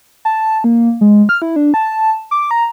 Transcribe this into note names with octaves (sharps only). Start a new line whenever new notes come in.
A5
A#3
G#3
F6
E4
D4
A5
D6
A#5